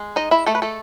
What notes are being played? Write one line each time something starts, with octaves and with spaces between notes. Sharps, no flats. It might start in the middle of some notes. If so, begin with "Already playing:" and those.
Already playing: G#3
D#4 D#5
E4 E5
A3 A4
B4
A3 A4